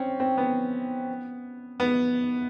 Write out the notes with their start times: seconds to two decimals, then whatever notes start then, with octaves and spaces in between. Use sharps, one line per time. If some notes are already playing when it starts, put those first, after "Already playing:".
Already playing: C4 C#4
0.20 C4
0.38 B3
1.80 B3